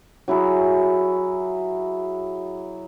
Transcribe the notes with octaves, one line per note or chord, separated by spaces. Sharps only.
F#3 E4 F#4 G#4